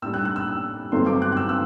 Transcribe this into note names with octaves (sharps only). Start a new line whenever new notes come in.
A2 G3 D4 E6
F#6
F#6
E6
G2 D3 F#3 A3 C4 C6
D6
F#6
F#6
E6
E6